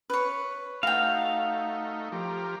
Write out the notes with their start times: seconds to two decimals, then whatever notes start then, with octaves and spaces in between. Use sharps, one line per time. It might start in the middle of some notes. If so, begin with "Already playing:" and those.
0.10 B4 C#5
0.83 A3 D#4 F#4 F5 G5
2.12 F3 G4 A#4